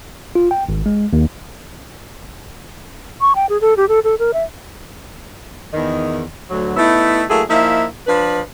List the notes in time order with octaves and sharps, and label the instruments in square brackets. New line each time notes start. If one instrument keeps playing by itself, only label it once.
[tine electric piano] F4
G5
G#1
G#3
D#2
[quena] C#6
G5
G#4
A4
G4
A4
A4
A#4
E5
[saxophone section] E2 D#3
D2 F#3
A3 B3 D#4 E4
F#3 A3 A#3 E4 G#4
F3 A#3 D#4 E4 E5
F3 D4 B4